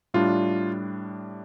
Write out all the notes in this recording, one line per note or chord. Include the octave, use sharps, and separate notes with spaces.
A2 G3 D4 F4